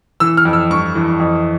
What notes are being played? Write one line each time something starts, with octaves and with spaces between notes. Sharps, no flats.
E3 E6
F6
F2
E6
G2 C#6
E3
F2